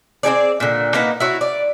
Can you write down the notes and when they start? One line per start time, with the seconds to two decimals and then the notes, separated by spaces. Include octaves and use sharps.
0.23 C4 D#4 G#4 D5
0.60 A#2 D3
0.94 A#3 D#4 B4 F#5
1.20 E4 F#4 C#5
1.41 D5